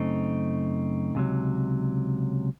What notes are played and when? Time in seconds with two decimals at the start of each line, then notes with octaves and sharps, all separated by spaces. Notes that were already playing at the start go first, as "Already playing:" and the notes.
Already playing: F#2 C#3 A3 C4 D#4
1.15 C#2 C3 F#3